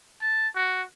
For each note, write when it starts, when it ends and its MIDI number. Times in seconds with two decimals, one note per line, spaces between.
0.22 0.48 81
0.56 0.83 66